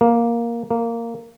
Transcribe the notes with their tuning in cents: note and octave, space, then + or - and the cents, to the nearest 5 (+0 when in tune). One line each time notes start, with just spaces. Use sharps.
A#3 +5
A#3 -10